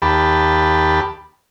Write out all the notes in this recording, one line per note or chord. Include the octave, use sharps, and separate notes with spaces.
D#2 G4 A5 B5